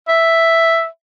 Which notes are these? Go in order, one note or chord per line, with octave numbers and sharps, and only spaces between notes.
E5